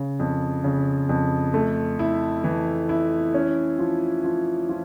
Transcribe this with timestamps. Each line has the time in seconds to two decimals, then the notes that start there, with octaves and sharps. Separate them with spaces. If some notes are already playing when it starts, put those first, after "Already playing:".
Already playing: C#3
0.19 F2
0.64 C#3
1.09 F2
1.54 A3
1.99 E4
2.44 E3
2.89 E4
3.34 C#4
3.79 F3
4.24 F3
4.69 F3